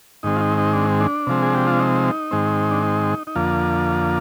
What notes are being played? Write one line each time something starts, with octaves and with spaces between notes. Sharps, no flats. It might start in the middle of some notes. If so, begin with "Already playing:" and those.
G#2 D#3 G#3 C4 D#4
F4
D#4
D#4
D4
D4
C3 F3 G#3 C4
G#4
G4
F4
D#4
G#2 D#3 G#3 C4
D4
D#4
D#4
F2 D3 F3 A#3 F4